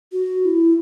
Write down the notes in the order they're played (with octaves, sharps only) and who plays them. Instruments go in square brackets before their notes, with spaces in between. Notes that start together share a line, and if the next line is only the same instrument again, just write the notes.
[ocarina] F#4
F#4
E4